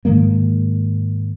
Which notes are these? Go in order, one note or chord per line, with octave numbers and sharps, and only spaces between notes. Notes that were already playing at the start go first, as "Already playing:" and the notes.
G#2 D#3 G#3 A#3